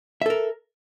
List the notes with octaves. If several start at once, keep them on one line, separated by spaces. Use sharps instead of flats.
A4 A#4 E5